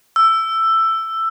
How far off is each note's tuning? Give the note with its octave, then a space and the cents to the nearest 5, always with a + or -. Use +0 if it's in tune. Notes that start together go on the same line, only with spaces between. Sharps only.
E6 +10